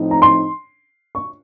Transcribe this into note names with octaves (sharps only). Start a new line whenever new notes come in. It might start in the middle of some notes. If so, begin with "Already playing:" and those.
Already playing: A2 F3 C4 D#4
A#5
C6
C#6